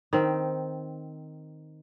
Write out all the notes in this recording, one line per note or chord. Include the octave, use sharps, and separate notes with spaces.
D#3 C4